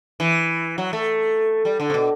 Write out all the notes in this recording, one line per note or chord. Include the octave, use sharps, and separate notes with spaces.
E3
F#3
A3
G3
D3
C3
B2